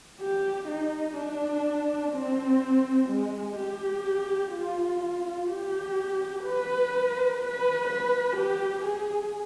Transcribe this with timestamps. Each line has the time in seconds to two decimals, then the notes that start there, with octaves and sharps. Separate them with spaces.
0.21 G4
0.68 D#4
1.16 D4
2.12 C4
3.08 G#3
3.57 G4
4.52 F4
5.48 G4
6.44 B4
7.40 B4
7.88 B4
8.37 G4
8.85 G#4